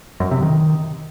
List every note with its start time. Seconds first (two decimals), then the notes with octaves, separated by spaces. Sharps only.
0.20 F#2
0.31 C3
0.42 D#3